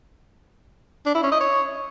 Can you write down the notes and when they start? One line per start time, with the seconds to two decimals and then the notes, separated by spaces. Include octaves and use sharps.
1.06 D4
1.15 E4
1.23 C#4
1.32 D#5
1.40 C#5